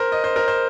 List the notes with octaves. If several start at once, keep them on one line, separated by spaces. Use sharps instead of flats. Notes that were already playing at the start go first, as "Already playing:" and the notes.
Already playing: A#4 C5
D#5
C5
A#4
C5